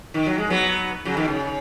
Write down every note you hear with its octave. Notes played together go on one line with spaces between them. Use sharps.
D#3
F#3
G#3
F#3 B3
C#3 F#3
B2 D#3
C#3